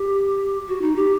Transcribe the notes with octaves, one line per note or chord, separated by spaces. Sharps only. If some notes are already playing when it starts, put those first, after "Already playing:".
Already playing: G4
F#4
D#4
G4